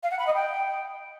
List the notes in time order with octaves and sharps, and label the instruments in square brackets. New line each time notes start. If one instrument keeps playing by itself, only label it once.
[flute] F5
F#5
B5
D#5
G5